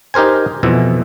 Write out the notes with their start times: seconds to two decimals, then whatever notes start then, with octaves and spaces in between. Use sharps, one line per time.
0.14 D#4 G4 A#4 C5 G#5
0.63 F2 B2 E3 E4